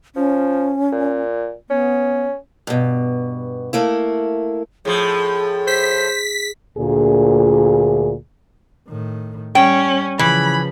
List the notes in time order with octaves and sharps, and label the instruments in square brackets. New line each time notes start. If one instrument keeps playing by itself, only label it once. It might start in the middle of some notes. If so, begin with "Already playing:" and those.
[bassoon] F3 [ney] C#4
[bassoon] A#2
[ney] B3 [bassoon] C#4
[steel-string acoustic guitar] G2 B2
A3 A#3 E4
[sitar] A2 F3 [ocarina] G#4
[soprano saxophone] C5 [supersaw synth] B6
[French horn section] D2 A#2 G#4
[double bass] A2 D#3
[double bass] G3 [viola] C#4 [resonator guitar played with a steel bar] G5
[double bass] C#3 F3 [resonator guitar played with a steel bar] E3 [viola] B5